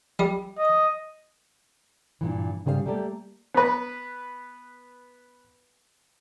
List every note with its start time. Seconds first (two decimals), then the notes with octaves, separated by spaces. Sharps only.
0.19 G3
0.58 D#5
2.21 G2 A#2 E3
2.65 G#2 C#3 G3 B4 F5
2.86 G3 A3 A#3 G4 D5
3.54 B3 B4